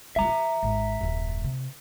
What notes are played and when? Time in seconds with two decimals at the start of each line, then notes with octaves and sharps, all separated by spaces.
0.16 G3 F4 E5 A#5
0.28 E3
0.63 G#1
1.01 D#1 F#2
1.44 C3